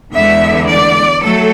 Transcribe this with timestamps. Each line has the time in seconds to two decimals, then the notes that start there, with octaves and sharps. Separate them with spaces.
0.13 E2 D3 G#3 B3 E5
0.68 D5
1.22 F#3 A3 A4